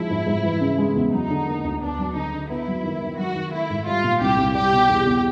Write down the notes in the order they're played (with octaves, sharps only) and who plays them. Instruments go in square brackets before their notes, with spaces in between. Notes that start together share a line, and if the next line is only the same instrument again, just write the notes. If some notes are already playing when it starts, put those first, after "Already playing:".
Already playing: [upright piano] F3 G#3 [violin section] E4
[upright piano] G#2
G#2
E3
C#3
G#3
E2
[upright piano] F#3 [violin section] D#4
[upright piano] D3
A#3
D2
[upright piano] B3 [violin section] D4
[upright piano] F#3
[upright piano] D3 [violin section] D#4
[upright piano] D3
[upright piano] B3 [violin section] E4
[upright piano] F#3
D#3
D#3
[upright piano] F#3 [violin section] F#4
[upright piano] D#3
[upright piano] A3 [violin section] E4
[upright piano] G#2
[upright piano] G3 [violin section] F4
[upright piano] A#2
[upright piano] C2 [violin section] G4
[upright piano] C2
[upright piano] G3 [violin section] G4
[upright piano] B2
E2
E2